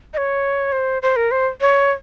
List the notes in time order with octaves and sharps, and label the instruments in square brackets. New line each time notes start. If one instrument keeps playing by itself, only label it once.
[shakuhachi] D#5
C#5
C5
C5
A#4
C5
C#5